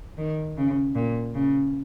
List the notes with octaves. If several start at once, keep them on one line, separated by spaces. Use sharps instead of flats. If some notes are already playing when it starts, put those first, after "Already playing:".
D#3
C#3
A#2
C#3